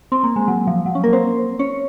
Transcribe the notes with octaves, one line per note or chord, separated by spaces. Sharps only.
C4
A#3
G#3
F#3
F3
F#3
C#4
A#3 A#4
C4 C5
C#4 C#5